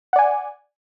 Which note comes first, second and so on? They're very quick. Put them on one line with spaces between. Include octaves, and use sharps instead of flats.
F#5 D5 G#5